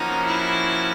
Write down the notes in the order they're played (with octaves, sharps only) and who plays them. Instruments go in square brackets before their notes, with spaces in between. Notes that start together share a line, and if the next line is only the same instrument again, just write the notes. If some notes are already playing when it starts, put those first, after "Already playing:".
Already playing: [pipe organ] F3 A#3 C#4 F#4 [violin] D#4
[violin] E4